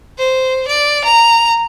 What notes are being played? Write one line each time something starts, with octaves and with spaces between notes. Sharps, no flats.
C5
D5
A#5